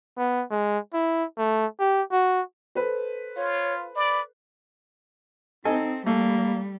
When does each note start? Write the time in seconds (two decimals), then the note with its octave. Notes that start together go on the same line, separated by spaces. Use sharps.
0.18 B3
0.50 G#3
0.93 E4
1.38 A3
1.79 G4
2.12 F#4
2.75 A4 B4 C5
3.36 F4 C#5
3.96 D5 B5
5.65 C4 D#4 A4 D#5 G#5
6.06 G3 A3 A#3